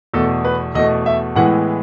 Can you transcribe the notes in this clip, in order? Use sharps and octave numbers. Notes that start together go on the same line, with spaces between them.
E2 B2 A3 A4
B4
E2 B2 A3 D#5
E5
A2 E3 G#3 B3 F#5